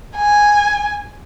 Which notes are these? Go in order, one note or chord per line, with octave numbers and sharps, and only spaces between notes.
G#5